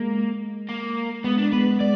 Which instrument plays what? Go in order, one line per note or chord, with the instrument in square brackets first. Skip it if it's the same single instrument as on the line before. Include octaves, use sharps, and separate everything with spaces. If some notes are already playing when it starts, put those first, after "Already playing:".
Already playing: [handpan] G#3 [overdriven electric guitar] A#3
[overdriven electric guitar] A#3
[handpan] G#3 [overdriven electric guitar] B3
[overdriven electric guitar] D4
[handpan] G#3 B3 [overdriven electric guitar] B4
[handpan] G#3 [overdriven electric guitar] D5